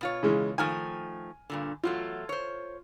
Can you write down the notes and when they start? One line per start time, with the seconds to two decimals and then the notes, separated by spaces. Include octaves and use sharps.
0.01 B2 F4 C#5
0.23 C#3 E3 G#3
0.58 D#3 F3 A3 G#5 F6
1.50 G2 A#2 D3
1.84 E2 F#3 A3 F4
2.29 C5 C#5